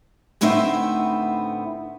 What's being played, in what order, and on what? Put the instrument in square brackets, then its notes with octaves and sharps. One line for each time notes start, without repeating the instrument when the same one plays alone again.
[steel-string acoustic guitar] D2 A2 B3 C4 D#4 E5